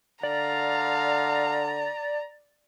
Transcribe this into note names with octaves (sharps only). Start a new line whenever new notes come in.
D3 D5 F5 A#5